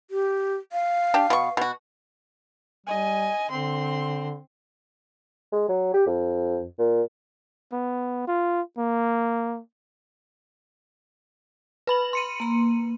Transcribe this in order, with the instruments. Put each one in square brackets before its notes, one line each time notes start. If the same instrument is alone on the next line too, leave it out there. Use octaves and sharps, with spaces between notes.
[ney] G4
F5
[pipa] D4 G4
B2 C#6
B2 F#4
[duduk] G3 [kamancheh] D#5 G#5
[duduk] D3 [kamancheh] C4 C6
[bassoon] G#3
F#3
G4
F2
A#2
[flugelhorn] B3
F4
A#3
[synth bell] B4 B5 F#7
C6 C#7 D#7
[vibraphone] A#3 A#5